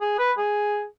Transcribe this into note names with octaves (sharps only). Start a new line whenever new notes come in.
G#4
B4
G#4